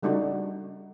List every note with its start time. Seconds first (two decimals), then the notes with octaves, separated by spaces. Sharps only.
0.02 C#3 G3 A3 D4 D#4 F#4